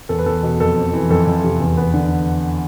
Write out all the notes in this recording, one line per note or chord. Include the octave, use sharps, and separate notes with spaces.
E2 A4
B4
E2 A4
B2
F2 A4
C4
E3
F2 A4
F2
C3
E2
B3
D3